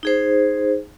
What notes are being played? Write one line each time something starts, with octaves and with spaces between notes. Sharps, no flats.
D#4 G#4 C5